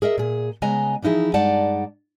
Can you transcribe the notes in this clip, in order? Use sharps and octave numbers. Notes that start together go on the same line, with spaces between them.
G#4 A#4 D#5 E5
A#2 G#4
C#3 G#3 B3 D#5 G#5 A#5
E3 F3 D#4 E4 G#4
G2 G#3 D#4 D5 F#5 A5